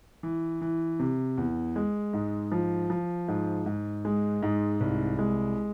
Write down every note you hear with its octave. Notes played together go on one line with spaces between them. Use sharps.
E3
E3
C3
E2
G#3
G#2
F3
F3
G#2
G#2
G#3
G#2
C2
G#3